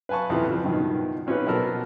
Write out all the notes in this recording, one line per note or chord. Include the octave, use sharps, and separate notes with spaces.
B4 F5 G#5 A5 C#6
F2 C3 E3 F3 B3
C#3 F3
G2 B2 D#3 F3
C4 C#4 D#4 F4 G4 B4
B2 F3 B3 A4 A#4